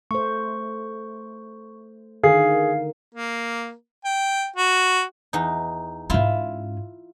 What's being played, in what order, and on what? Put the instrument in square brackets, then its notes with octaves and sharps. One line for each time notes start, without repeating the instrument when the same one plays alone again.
[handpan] A3 C5 [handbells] C#6
[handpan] D3 D#3 [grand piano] G#4 [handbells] F5 C7
[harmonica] A#3
G5
F#4
[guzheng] E2 D#4
[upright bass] G#2 C#4 [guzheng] E4 F4 E5